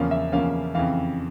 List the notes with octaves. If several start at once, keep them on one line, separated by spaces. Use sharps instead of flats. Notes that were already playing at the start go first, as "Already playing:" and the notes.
Already playing: E2 C#3 F3 A#3 C#4 F5
E5
E2 C#3 F3 A#3 C#4 F5
F2 C#3 E3 F5